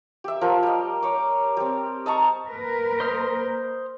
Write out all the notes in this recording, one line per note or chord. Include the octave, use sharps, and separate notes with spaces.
G4 E5
F3 A#4
G3 D#5
C#5 D6
G3 C4
D#5 A5 A#5 C#6
A#3 A#4 B4
C5 D#5 F6